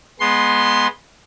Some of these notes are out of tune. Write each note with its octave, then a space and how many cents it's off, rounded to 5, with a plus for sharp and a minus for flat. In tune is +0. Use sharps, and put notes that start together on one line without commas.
G#3 +0 B3 -10 C6 +5